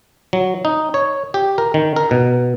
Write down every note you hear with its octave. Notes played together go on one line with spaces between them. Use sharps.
F#3
D#4
C#5
G4
A#4
D#3
A#4
B2